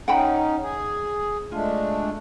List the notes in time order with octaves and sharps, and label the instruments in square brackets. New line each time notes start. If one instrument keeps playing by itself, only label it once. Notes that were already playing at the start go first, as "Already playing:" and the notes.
[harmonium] C#4 D#4 [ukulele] F#5 G5 B5
[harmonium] G#4
[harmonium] G#3 A3 D4 [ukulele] F4